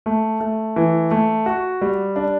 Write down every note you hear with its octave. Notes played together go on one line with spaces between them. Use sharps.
A3
A3
E3
A3
F#4
G3
D4